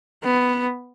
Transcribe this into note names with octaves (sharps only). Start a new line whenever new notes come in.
B3